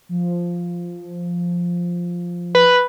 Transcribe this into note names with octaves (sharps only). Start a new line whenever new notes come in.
F3
B4